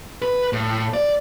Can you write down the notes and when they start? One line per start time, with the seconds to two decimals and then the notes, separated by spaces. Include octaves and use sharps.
0.22 B4
0.53 A2
0.94 D5